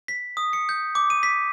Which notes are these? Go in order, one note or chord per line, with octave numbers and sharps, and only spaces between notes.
B6
D#6
C#7
G6
D6
D#7
B6